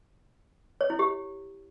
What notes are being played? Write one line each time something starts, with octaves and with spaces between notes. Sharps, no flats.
C#5
E4
G4